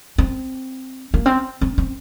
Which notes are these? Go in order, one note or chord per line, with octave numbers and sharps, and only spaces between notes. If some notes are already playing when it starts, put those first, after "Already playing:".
C4
A#3
C4
C4
C4